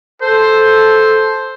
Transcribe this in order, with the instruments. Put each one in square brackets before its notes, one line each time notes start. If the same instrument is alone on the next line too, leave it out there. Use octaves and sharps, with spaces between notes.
[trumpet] A4 [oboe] C5